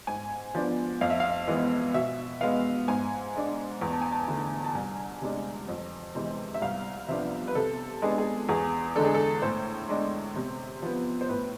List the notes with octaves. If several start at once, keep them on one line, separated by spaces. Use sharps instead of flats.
G#2 G#5
F3 B3 D4
F2 F5
E5
F5
E3 G#3 B3
B2 E5
G#3 B3 F5
G#2 G#5
G#3 D4
E2
A5
G#5
A5
D3 A3
A5
C2 G#5
C3 G#3 D4
F2
C3 E3 G#3 C4
E5
C2 F5
C3 F3 B3 D4 E5
B4
C3 A4
G#3 B3 D4 G#4
G#4
E2 G#4
D3 G#3 D4 A4
G#4
A4
A2 C5
G#3 D4
C3
F3 B3
C5
A2 B4